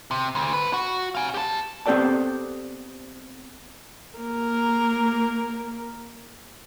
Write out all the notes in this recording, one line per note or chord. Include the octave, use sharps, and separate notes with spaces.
C3
D2
G2 B4
F#4
F5 G#5
G4 A5
B3 C4 G4 A4 D5 A5
A#3 A#4